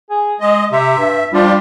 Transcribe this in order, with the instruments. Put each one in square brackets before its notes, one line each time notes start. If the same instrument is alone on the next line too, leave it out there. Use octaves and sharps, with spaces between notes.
[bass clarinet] G#4
[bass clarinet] G#3 [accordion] D#5
[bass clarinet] C3 [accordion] E5
[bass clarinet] G2
[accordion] F3 D4 F4 [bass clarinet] G3